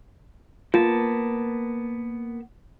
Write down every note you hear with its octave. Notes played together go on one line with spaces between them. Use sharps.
A#3 B3 F4 A5